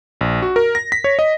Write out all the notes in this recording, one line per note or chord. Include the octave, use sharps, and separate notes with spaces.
A#1
F#4
A#4
A#6
B6
C#5
D#5